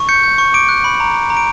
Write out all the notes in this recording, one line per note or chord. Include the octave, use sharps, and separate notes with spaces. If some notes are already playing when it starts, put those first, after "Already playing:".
Already playing: C#6
G6 C#7
G6
C#6
D6 D7
F#6
B5
A#5
A#5
A#5
D7